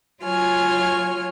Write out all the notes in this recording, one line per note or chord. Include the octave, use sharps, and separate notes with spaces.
F#3 F4 C#5 G#5 F6